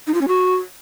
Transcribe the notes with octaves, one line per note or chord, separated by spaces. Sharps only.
D#4
F4
C#4
F#4